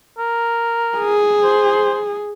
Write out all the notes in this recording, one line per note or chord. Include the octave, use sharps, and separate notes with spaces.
A#4
G#4
C5